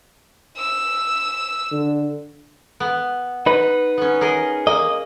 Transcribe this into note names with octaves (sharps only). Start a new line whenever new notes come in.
E6
D3
B3
D#4 B4
B3 C#4
G#4 A#4 D#5
A#3 D#5